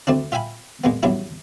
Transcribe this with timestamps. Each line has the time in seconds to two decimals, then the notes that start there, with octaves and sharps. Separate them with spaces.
0.07 D2 A3 C4 D4
0.32 F4 E5 G5 G#5 B5
0.84 A#2 G#3 B3
1.03 A#1 E2 G2 F#3 C#4 E4